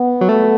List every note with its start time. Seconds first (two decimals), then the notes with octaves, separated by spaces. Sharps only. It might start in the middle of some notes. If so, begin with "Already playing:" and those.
Already playing: B3
0.21 F#3
0.29 A3